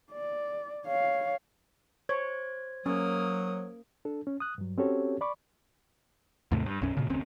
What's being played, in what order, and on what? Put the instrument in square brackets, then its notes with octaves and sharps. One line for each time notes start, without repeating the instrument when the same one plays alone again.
[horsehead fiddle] D5
C#5 F5
[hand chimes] C5 G#6 [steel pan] C#5
[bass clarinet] F#3 [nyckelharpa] A#3 D#6 [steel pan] C#4
[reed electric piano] D4 A4
C#4
D#6 F#6
G2 F#3
C4 C#4 F#4 G4 A4 C#5
D5 B5 C#6 D6
[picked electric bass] D#2 G#2 C3 A3
G2
B1 F#2 C#4
A#2 C#3
F1 D2 C4 C#4